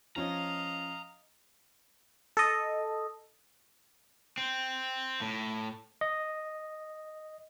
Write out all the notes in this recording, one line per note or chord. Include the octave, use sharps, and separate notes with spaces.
F3 C#4 F4 D#5 F5 A#5
A4 D#5
C4
A2
D#5